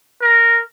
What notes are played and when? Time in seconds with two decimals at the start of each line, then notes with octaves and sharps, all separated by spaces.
0.22 A#4